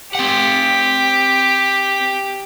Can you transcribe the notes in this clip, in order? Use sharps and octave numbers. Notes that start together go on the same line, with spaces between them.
C4 G4 F#5